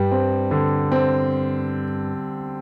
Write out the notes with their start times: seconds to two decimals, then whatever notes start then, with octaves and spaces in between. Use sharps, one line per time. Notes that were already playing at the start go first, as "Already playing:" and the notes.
Already playing: G2 G3
0.11 C4
0.51 D3
0.92 C4